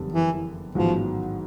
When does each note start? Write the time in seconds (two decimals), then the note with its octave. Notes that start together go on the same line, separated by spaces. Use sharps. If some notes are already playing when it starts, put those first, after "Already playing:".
Already playing: F#1 F2 D3 G3 B3
0.12 E3
0.75 A1 G#2 D#3 F3 F#3 B3